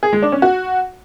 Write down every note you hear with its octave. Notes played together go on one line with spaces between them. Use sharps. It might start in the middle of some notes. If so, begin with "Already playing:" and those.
G#4
G#3
D4
C#4
F#4